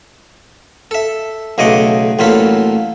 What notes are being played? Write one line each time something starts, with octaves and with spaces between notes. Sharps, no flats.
A4 E5
B1 C#3 A3 D#5 F#5 D6
A1 A#2 F#3 F4 A4 B5